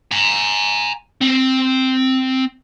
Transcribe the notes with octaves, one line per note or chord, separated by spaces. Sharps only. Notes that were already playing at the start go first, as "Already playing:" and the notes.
G#5 A#5
C4